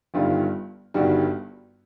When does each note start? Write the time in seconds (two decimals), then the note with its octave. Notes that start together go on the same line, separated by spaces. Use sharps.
0.14 G1 G2 D#3 G3 F4
0.94 G1 G2 D#3 G3 F#4